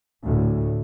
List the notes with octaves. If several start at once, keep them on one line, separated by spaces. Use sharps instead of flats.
D2 A2